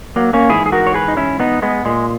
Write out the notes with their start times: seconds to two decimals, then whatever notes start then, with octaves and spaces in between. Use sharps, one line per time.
0.16 F#3 A#3
0.33 A#3 C#4
0.49 G#2 E3 E4 G#4
0.66 G#4
0.72 F#4 A#4
0.87 C#5
0.94 G#4 B4
1.08 D#4
1.17 C#4 E4
1.40 B3 D#4
1.62 G#3 B3
1.85 A#2 G#3